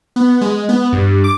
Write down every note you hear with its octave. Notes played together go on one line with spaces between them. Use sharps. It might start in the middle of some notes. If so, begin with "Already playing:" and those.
B3
G#3
B3
G2
D6